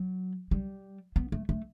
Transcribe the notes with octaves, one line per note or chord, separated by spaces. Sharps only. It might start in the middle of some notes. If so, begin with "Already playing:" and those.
Already playing: F#3
G3
B3
A3
A3